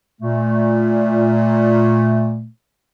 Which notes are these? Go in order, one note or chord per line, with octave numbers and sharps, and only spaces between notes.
A#2 A3